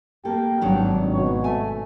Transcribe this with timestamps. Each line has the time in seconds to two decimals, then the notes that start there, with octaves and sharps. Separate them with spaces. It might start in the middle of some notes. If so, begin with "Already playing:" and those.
0.25 A#3 G4 A4 G5
0.61 G#1 G2 D#3 F#3 D4
1.13 B2 C#5
1.44 A3 G#5